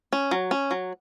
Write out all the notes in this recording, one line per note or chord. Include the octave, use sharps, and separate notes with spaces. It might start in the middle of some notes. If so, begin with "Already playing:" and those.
C#4
F#3
C#4
F#3